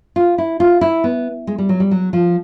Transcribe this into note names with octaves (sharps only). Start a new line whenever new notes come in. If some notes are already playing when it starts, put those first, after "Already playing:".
F4
E4
F4
E4
B3
G#3
G3
F#3
G3
F#3
F3